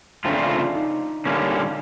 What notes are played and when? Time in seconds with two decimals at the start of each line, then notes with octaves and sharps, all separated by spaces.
0.25 C#3 F3 A3 C4 D4 F4
0.50 D4
0.75 D#4
1.26 D3 G3 A#3 C#4